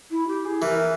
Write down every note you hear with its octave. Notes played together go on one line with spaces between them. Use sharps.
E4
G4
G#4
E3 A#4